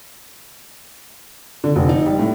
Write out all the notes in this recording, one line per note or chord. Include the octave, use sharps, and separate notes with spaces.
D3
F1
D#4
G3
A2